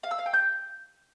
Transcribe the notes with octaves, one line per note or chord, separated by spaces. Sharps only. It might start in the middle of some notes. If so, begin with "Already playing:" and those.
F5
E6
F5
G5
G6